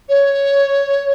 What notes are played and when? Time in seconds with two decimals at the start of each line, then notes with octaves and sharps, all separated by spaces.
0.09 C#5